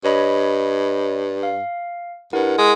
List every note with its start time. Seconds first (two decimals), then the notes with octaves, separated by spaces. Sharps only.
0.04 G2 C#5 D#5 B5
1.43 F5
2.33 G2 E4 A#4 F#5
2.58 G#3